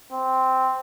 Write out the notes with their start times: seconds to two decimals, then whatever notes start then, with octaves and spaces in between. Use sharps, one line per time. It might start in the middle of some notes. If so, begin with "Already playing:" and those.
0.12 C4